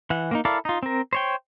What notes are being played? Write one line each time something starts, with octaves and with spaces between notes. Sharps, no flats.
E3 F#5
A#3 C4 D#4
E4 A4 A#4 D5 F5
D#4 F4
C4 A#4
C5 C#5 G5